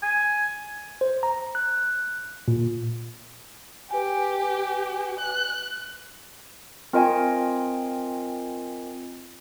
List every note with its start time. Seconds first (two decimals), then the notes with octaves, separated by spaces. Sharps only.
0.03 G#5
1.01 C5
1.23 A#5
1.55 F#6
2.48 A#2
3.91 G4 B4 G#5
5.18 F#6
6.93 C4 F4 A#4 D#5 G5 G#5